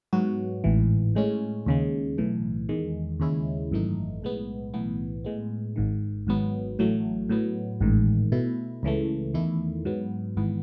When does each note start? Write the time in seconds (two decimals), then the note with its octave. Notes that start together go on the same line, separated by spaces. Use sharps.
0.13 G#2 F#3 B3 F#4
0.64 A1 G#2 E3
1.15 A2 G#3 C#4
1.66 D#2 C#3 G#3
2.18 B1 A2 E3
2.69 E2 D#3 G#3
3.20 D#2 C#3 G#3 C#4 E4
3.71 G#1 F#2 E3 A3 D#4
4.22 B1 A2 G#3 B3
4.74 B1 A2 E3 B3
5.24 A2 G#3 B3
5.76 G#1 G#2 D#3
6.27 G#1 G#2 F#3 B3
6.79 A1 A2 F#3 A3
7.29 A2 F#3 B3
7.81 A1 G#2 D#3
8.32 B2 A3 E4
8.83 C#2 C#3 E3 A3
9.34 E2 D#3 A3 E4
9.85 G#2 F#3 B3
10.37 G#1 G#2 E3 B3